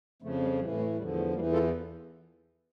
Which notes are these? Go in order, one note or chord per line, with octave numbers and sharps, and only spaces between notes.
F2 C#3 F3 A3
G3
A2 E3 G3
A3
E2 D3 F3 G3
A3
E2 E3 G3 A#3
F4 A4